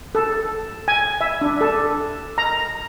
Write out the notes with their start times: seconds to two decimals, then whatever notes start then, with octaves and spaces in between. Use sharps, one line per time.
0.15 A4
0.88 G#5
1.21 E5
1.41 D4
1.61 A4
2.38 A#5